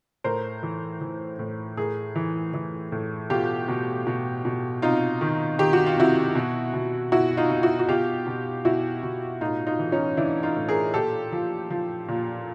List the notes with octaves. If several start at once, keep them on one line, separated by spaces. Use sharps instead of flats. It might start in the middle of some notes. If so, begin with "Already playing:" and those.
A2 A#4 C5
E3
E3
A2
A2 G#4 A#4
E3
E3
A2
B2 F4 G4
B2
B2
B2
C3 D#4 F4
D#3
D#3 G4
F#4
F4
C3 E4 F#4
B2
B2
B2 E4 F#4
D#4 F4
B2
E4 F#4
F#4
B2 F4 G4
B2
B2 E4 F#4
B2
A2 D#4 F4
D#4 F4
E3
C#4 D#4
E3 D4 E4
D#4 F4
A2
G#4 A#4
A#2 G4 A4
F3
F3
A#2